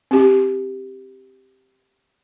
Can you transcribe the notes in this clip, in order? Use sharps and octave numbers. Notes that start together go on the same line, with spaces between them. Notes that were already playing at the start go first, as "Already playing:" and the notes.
C4 G4